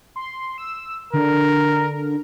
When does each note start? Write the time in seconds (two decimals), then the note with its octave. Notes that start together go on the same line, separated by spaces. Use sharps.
0.16 C6
0.58 E6
1.14 D3 A#4